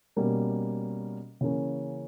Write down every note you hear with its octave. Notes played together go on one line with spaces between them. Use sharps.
B2 G3 A#3 C#4
C#3 E3 A#3 C#4